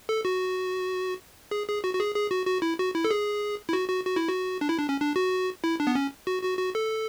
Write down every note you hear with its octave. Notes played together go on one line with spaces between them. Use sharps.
A4
F#4
G#4
G#4
F#4
F#4
G#4
G#4
F#4
F#4
E4
F#4
E4
A4
G#4
E4
F#4
F#4
F#4
E4
F#4
D4
E4
D4
C#4
D4
F#4
E4
D4
B3
C#4
F#4
F#4
F#4
A4